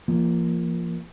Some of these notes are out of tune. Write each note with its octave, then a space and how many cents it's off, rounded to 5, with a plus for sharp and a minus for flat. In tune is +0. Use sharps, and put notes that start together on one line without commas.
F3 -30 A#3 +0